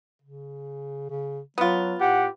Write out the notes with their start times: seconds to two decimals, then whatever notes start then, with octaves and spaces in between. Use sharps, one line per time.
0.22 C#3
1.10 C#3
1.58 F#3 B3 F4
2.00 A2 G4 F#5